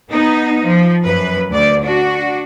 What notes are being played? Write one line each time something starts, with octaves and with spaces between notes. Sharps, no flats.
B3 D#4
F3
F#2 B4
D2 D5
D4 F#4